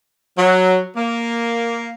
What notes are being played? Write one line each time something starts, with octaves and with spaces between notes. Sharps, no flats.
F#3
A#3